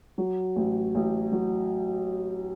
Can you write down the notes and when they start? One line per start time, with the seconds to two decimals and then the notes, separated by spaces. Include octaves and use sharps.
0.18 F#3
0.56 A1
0.95 A1
1.32 F#3